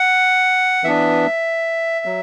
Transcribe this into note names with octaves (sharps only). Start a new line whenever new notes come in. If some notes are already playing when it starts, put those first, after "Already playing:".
Already playing: F#5
E3 B3 D4 E5
F#3